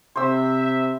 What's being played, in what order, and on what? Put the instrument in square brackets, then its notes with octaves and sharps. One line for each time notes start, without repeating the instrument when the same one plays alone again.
[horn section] C3 E5 [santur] C5 E6